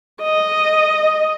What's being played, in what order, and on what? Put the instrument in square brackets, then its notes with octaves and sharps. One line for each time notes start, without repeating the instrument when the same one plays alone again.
[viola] D#5